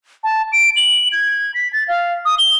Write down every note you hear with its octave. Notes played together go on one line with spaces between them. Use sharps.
A5
D7
F#7
G#6
B6
A6
F5
D#6
G7